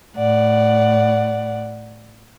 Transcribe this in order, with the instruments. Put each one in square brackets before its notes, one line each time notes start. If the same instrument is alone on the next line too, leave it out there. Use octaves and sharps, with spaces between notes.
[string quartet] A2 D5 F#5